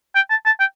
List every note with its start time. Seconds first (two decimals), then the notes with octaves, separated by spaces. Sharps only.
0.15 G5
0.30 A5
0.46 A5
0.60 G5